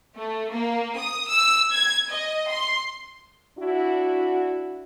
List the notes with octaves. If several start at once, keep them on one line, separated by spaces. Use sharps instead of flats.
A3
A#3
D#6
E6
G#6
D#5
C6
D4 E4 F#4